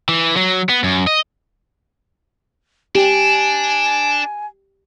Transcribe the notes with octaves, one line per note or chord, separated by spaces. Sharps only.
E3
F#3
B3
F#2
D#5
D4 G4 G#5